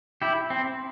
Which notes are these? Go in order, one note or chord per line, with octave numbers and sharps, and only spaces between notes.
E4 G4
C4